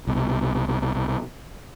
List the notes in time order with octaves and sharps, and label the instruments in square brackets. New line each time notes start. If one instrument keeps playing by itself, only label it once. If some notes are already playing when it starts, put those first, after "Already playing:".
[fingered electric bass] C2 B2